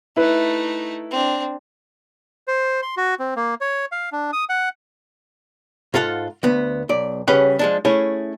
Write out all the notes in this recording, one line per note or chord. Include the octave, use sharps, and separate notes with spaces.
A3 D#4 E4 B4
C4 D4
C5
C6
F#4
C4
A#3
C#5
F5
D4
D#6
F#5
G#2 F4 A4 F5 F#5
D2 B3
B1 D5
C#3 G3 C#4 G#4 B4 F#5
F3 G#3 D4
A3 C#4 E4 G#4 C#5